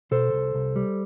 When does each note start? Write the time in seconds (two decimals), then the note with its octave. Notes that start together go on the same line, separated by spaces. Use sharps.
0.11 B2 A4 C5
0.33 C2
0.54 C2
0.76 G3